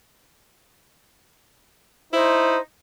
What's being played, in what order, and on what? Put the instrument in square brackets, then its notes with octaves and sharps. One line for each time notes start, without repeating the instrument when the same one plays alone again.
[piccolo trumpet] D#4 [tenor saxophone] E4 [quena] C5